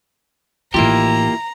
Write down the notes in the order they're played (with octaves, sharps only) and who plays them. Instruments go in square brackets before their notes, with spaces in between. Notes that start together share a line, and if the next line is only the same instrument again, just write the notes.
[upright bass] A1 D#3 [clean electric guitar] A#3 G4 [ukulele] E4 F4 [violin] A#5